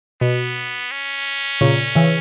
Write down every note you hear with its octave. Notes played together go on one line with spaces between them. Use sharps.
B2 B3
C#4
A#2 C#3
C#3 E3